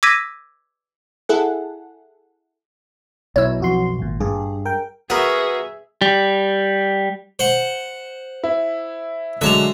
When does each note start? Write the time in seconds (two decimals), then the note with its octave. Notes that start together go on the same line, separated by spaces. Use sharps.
0.03 D6 E6 G#6 A#6 B6 D#7
1.29 E4 G#4 A4 F#5
3.36 B1 B2 E4 C#5 E6
3.60 F2 F#4 C6
3.99 G#1 A#2
4.20 G2 G#4
4.65 A#4 G5
5.10 B3 F#4 G#4 A#4 E5
6.02 G3
7.39 C5 F#5
8.44 E4
9.41 D3 F#3 G#3 E5 A5 A#5